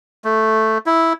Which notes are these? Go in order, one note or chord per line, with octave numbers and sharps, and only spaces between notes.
A3
E4